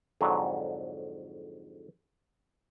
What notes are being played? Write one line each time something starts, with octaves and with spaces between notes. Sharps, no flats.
F2 G#2 D3 F#3